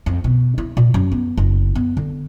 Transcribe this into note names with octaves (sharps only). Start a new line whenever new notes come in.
F2
B2
E4
A#2
F#2
B3
F#1
B3
D3